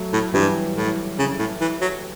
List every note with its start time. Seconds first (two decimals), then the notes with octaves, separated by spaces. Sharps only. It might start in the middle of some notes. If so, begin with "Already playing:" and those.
Already playing: F#3 A3
0.13 A2
0.34 G2 E3 G3
0.77 A2
1.19 C#3
1.39 A2
1.61 E3
1.81 F#3